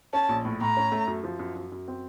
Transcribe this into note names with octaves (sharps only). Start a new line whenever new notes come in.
C#4 A5
A#1
A2
A2 A#5
C#4
A3
F#2
F3
F#2
F#2
F#2
C4